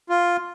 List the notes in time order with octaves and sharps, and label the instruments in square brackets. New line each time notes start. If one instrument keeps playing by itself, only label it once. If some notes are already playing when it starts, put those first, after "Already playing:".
[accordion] F4